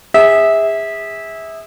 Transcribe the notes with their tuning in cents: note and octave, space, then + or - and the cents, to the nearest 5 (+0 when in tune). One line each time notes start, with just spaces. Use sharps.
G#4 -30 E5 -20